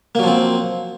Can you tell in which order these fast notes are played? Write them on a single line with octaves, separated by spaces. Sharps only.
A#3 F#3 F3 C4